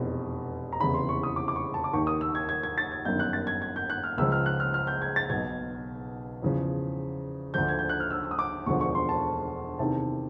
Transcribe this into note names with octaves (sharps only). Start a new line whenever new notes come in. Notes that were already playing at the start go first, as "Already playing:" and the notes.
Already playing: F1 E2 B2
A#5
F1 E2 C#3 E3 B5
C6
C#6
D#6
D6
D6
C#6
A5
D6
D#2 D#3 C#6
D#6
E6
G#6
G#6
G#6
A6
G#6
G1 F#2 D#3 G6
F#6
A6
G#6
G#6
G6
F#6
F6
C#2 C#3 F3 E6
F6
F#6
F6
F6
G6
G#6
A6
B1 B2 G#6
E2 C#3 F3
D2 D3 F3 G6
G#6
G6
F#6
F6
E6
E6
D#6
D6
E1 D2 D3 F3 C#6
C#6
C6
A5
E2 C3 D#3 A5